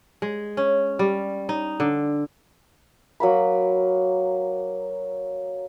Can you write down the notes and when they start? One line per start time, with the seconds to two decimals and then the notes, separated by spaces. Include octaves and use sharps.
0.22 G#3
0.57 C#4
0.99 G3
1.49 D#4
1.80 D3
3.20 F#3 A#3 B5